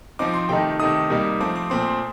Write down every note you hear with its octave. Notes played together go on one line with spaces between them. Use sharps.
F3 C4 D#4 D6
C6
C3 D#3 A3 D#4 G5
C3 D#3 A3 D#4 D#6
C3 G3 A#3 D#4
F3 A3 C4 D6
D6
A#2 A3 C4 C6